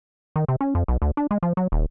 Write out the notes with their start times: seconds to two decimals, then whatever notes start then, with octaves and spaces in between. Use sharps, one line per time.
0.36 D#3
0.48 C3
0.61 C#4
0.75 F2
0.88 B1
1.02 D2
1.17 D4
1.31 G#3
1.43 F3
1.57 F#3
1.72 D#1